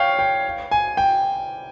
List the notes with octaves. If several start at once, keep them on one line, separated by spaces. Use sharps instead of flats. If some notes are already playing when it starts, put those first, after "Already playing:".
Already playing: C#5 F5 G5
G5
G#5
G5